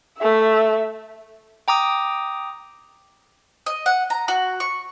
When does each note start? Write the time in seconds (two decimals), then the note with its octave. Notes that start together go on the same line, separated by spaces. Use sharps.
0.18 A3 E5
1.68 G5 A#5 D6 D#6
3.66 D#5
3.86 F#5
4.10 A#5
4.28 F#4
4.60 C#6